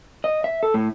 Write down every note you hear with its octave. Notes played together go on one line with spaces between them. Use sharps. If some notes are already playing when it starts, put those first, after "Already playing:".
D#5
E5
A4
A2